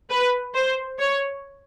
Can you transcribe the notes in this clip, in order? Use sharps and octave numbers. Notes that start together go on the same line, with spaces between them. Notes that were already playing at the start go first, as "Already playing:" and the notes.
B4
C5
C#5